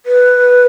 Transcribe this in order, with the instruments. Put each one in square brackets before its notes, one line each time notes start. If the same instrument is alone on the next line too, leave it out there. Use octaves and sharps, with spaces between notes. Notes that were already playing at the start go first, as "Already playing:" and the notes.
[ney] B4